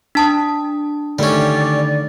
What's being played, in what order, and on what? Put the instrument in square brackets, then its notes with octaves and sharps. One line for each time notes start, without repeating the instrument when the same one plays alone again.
[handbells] D4 A5 D#6
[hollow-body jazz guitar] D3 D#3 A3 [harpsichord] G3 C#4 [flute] D5